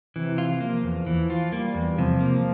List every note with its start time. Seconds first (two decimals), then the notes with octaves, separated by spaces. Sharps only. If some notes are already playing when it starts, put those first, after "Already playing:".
0.16 C3 E3
0.38 F4
0.61 F3 A#3
0.84 E2
1.07 E3
1.30 F4
1.52 G3 A#3
1.75 E2
1.98 C3 F3
2.20 A#3